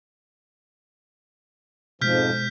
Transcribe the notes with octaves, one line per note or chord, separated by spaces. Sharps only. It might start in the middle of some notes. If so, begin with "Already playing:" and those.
F2 G#2 B2 F3 G#3 F6 G6 B6